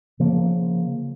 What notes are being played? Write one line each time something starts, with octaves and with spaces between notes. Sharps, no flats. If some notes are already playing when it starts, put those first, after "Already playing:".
C#3 F3 A#3